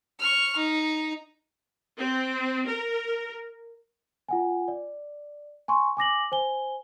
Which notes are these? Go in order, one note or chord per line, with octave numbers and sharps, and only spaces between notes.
C#6 F6
D#4
C4
A#4
F4 F#5 G#5
D5
G#5 C6 C#6
G#5 D6 A#6 F#7
C5 G#5 G7